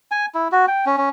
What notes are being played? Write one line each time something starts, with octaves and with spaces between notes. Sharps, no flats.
G#5
E4
F#4
G5
C#4
C#4